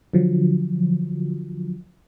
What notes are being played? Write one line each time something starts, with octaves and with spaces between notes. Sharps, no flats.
D3 F3 F#3